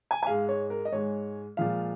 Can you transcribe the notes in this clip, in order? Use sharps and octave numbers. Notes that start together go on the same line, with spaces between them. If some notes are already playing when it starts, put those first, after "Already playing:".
G#5
G#5
G#2 G#3 F5
C#5
A#4
D#5
G#2 G#3 C#5
A#2 F3 G#3 F5